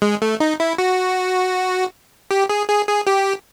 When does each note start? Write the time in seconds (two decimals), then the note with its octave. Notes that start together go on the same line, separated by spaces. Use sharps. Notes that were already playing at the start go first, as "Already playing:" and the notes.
0.02 G#3
0.22 A3
0.40 D#4
0.60 E4
0.78 F#4
2.31 G4
2.49 G#4
2.69 G#4
2.87 G#4
3.07 G4